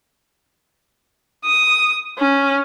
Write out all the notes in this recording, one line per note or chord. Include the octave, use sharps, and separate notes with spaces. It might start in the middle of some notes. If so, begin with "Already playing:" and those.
D#6
C#4